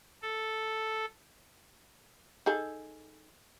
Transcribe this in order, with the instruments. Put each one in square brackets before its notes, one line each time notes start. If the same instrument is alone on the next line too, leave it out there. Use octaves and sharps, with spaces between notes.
[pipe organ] A4
[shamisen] D#4 G#4 A4